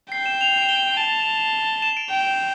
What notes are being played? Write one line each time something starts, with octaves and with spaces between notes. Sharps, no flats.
G5 C7
E7
F7
G7
A5
E7
D7
G5